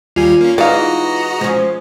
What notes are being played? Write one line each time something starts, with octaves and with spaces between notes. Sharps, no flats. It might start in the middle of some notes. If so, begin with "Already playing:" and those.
D#2 G3 F4 G#5
A#3 C#4
E3 G#3 D#4 F#4 D5 D#5 F5 A#5
F3 G#3 C#4